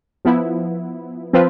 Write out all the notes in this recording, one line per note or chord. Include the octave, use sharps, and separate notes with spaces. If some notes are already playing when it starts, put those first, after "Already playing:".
F3 B3 E4
F3 C4 F4 B4